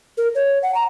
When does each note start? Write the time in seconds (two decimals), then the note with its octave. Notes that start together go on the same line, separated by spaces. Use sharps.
0.18 A#4
0.35 C#5
0.63 F#5
0.75 A#5